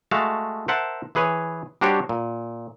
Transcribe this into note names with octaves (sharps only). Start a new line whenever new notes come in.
G#3 A3 F#4 F5 A5
A#4 C5 E5 F#5 A5
E3 G#4 B4 C#5 G#5
G3 D4 F#4 G4 C5 C#5
A#2